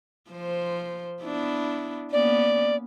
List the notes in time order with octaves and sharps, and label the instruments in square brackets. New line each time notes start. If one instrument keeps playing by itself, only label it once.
[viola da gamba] F3 C5
B3 D4 E4
[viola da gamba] A#3 B3 C#4 [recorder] D5